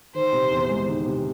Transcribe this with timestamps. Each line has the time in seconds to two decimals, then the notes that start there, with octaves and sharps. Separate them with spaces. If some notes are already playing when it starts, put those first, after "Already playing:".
0.15 D#3 C5
0.33 C3
0.51 E2
0.69 G#3
0.88 D#3
1.06 C3